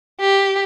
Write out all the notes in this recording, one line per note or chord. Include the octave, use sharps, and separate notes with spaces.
G4